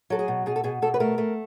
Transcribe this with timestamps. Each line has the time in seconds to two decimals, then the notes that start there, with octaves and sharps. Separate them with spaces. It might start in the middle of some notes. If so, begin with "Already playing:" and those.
0.10 F#3 A4
0.19 G#4
0.28 B2
0.46 B2 G#4
0.56 A4
0.64 B2 G#4
0.82 B2 A4
0.94 B4
1.00 A3 A#4
1.18 A3